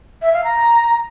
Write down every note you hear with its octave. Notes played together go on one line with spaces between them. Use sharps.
E5
F5
A#5